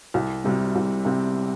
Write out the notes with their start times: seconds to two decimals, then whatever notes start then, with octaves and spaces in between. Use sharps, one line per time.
0.14 C2
0.44 C3 G3 C4
0.75 C2
1.05 C3 G3 C4